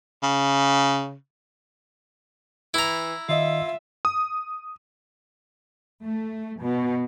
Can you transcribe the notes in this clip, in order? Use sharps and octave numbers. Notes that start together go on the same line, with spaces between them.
C#3
E3 E4 A#5
D#3 F4 D#5 E5
D#6
A3
B2